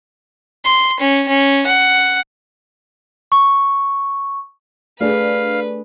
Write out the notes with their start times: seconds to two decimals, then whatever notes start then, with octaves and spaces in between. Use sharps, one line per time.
0.65 C6
1.00 C#4
1.28 C#4
1.67 F#5
3.32 C#6
5.00 A3 D4 G#4 B4 F5